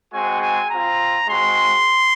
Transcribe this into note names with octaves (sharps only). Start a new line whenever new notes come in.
G#3 C4 F#4 G#5
G#5
C4 F4 A#5
G#3 C4 F#4 C6